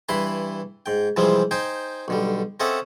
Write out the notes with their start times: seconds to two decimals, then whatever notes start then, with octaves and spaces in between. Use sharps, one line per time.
0.09 G2 E3 E4 B4 B5 C6
0.86 G#2 G5
1.16 C3 E3 F3 G3 G#3 C4
1.51 D#4 C5 G5 G#5
2.08 B1 D3 G3
2.60 C4 C#4 A4 D#5 E5 F#5